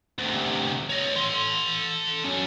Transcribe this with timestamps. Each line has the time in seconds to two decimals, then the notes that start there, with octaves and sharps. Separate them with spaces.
0.19 D2 C3
0.90 C#5 D#5
1.16 A4 C6
2.24 F#3 C#4